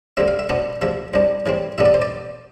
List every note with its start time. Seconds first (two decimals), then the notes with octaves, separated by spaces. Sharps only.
0.17 D2 D3 G3 C4 E5
0.28 F5
0.39 E5
0.49 B2 B3 D4 C5
0.82 D2 C3 F3 E5
1.14 C2 C3 G3 D4
1.46 A2 E3 G3 C4
1.78 A1 A2 G3 B3 D4 E5
1.85 D5
1.94 C5
2.02 D5